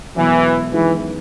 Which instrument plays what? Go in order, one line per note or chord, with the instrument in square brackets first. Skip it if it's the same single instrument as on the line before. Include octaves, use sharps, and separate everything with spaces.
[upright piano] E1 E2 B2 F#3 [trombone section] E3
[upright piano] F#2 D#3 G#3 B3 [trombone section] E3